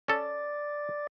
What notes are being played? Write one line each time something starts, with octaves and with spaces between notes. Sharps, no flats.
C#4 A4 D5